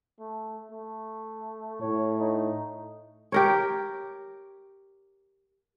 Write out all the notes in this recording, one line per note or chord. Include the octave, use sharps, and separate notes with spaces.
A3
A3
A2 C#5
D#4
G4 A#4 C#5